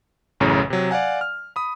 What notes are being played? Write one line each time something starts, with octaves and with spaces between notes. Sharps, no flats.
A1 F#2 A2 C#3 C#4 A#5
C3 F#3
D5 F5 F#5 G#5
F6
B5 D#6